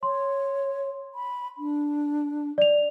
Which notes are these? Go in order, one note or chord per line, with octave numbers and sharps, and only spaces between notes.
C#5 C6
B5
D4
D5 F7